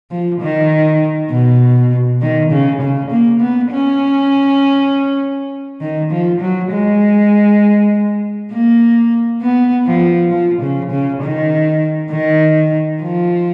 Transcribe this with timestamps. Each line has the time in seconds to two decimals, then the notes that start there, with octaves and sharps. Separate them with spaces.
0.11 F3
0.41 D#3
1.30 B2
2.21 D#3
2.51 C#3
2.81 C#3
3.11 A#3
3.40 B3
3.71 C#4
5.81 D#3
6.11 F3
6.41 F#3
6.71 G#3
8.51 A#3
9.42 B3
9.86 F3
10.31 F3
10.62 C#3
10.91 C#3
11.22 D#3
12.11 D#3
13.02 F3